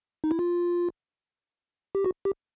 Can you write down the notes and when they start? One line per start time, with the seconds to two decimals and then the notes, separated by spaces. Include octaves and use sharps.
0.24 D#4
0.31 E4
0.39 F4
1.95 G4
2.05 F#4
2.25 G4